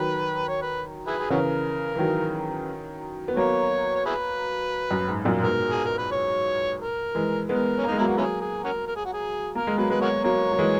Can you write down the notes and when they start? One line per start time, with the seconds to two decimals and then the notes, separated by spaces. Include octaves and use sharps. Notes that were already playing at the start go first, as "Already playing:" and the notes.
Already playing: D#3 F#3 B4
0.48 C#5
0.62 B4
1.07 E4 G#4 B4
1.19 G#4
1.30 C#3 E3 C#4 F#4 A#4
1.96 E3
1.98 D#3 F#3
3.28 B3
3.36 F#3 A#3 C#5
3.95 C#5
4.06 E4 G#4 B4
4.91 F#2
5.08 G#2
5.25 F#2 A#2
5.43 G#2 B2 A#4
5.70 G#4
5.85 A#4
5.98 B4
6.12 C#5
6.80 A#4
7.15 E3 G#3
7.49 G#3 B3 A#4
7.78 C#4
7.84 A#3
7.88 G#3 D#4
7.98 F#3 A#3 E4
8.08 F#4
8.18 F#3 A#3 C#4 E4 G#4
8.41 G#4
8.64 C#4 F#4 A#4
8.87 A#4
8.96 G#4
9.05 F#4
9.13 G#4
9.55 A#3 A#4
9.67 G#3
9.78 F#3 A#3 B4
9.90 G#3 B3 B4
10.02 F#4 A#4 C#5
10.24 F#3 A#3 C#5
10.52 F#3
10.59 E3 G#3